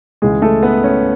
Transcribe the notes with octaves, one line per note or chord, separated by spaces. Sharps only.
C#2 C#3 E3 G#3 G#4
A3 A4
B3 B4
C#4